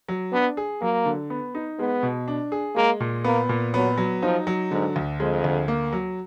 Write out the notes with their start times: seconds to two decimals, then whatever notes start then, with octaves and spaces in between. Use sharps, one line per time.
0.08 F#3
0.32 B3 D4
0.57 G#4
0.82 F#3 A#3
1.06 D3
1.30 B3
1.55 D#4
1.79 G#3 B3
2.03 B2
2.28 D4
2.52 G#4
2.76 G#3 A#3
3.00 A#2
3.24 A#3 B3
3.49 A#2
3.74 F#3 B3
3.97 F#3
4.22 F3 D#4
4.47 F#3
4.71 G#2 D3
4.96 D2
5.20 F2 G#3
5.44 D2
5.68 A#3
5.93 F#3